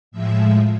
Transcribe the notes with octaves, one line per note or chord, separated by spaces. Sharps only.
A2 F3 G#3 E5